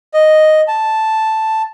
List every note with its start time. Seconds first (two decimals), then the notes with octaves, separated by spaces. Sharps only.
0.14 D#5
0.68 A5